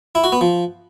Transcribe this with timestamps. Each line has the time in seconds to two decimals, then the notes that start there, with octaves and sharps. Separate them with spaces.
0.15 E4
0.24 F#4
0.32 B3
0.41 F3